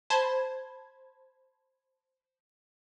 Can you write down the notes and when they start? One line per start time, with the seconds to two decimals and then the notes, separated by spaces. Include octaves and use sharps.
0.10 C5 A5 B5 G#6